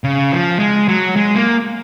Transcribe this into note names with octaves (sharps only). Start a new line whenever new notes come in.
C#3
F3
G#3
F#3
G#3
A#3